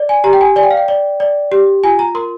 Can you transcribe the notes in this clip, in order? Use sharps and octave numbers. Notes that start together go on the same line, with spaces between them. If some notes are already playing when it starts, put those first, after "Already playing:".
Already playing: D5
G#5
G4 A#5
G5
G#5
D5 G#5
G5
F5
G5
D5
D5
G4
F4 G#5
A#5
A#4 C6